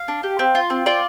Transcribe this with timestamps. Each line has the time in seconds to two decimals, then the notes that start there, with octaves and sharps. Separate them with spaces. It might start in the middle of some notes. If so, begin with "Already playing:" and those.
Already playing: F5
0.08 D4
0.23 G4
0.39 C4
0.55 F4
0.70 C4
0.86 F4 D5